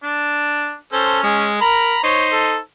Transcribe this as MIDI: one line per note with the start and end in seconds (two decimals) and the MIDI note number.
0.03 0.75 62
0.93 1.51 61
0.93 1.19 69
0.93 1.19 72
1.23 1.56 56
1.61 1.94 70
1.61 2.02 82
1.61 2.02 83
2.03 2.58 63
2.03 2.58 72
2.03 2.25 73
2.32 2.57 69